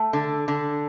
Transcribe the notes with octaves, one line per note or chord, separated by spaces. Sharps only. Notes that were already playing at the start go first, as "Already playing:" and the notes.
Already playing: A3
D3
D3